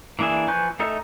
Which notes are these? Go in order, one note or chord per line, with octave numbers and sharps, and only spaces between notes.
E3 A#3 D4 G#4 E5
F3 B4 G#5 C#6 G6
A3 D#4 A4 E5 E6